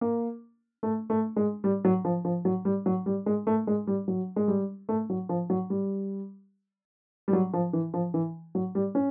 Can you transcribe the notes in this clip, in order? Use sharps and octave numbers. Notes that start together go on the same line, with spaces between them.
A#3
A3
A3
G#3
G3
F#3
F3
F3
F#3
G3
F#3
G3
G#3
A3
G#3
G3
F#3
G#3
G3
A3
F#3
F3
F#3
G3
G3
F#3
F3
E3
F3
E3
F#3
G3
C#4